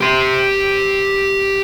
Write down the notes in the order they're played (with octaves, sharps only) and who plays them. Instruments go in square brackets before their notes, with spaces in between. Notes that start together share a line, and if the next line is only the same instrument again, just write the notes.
[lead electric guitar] G4 C6